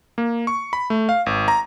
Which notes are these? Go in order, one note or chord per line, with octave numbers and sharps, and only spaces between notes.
A#3
C#6
B5
A3
F5
G#1
A#5